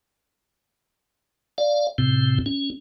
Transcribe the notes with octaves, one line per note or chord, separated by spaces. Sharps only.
D5 F5
A2 C3 C4
C#4